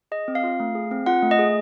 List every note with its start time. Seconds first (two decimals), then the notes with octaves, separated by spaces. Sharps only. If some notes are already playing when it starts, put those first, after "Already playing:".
0.12 G#4 D#5
0.28 C4
0.35 F5
0.44 F4
0.60 A3
0.75 G#4
0.91 C4
1.06 F4 F#5
1.22 A3
1.31 D#5
1.39 G#4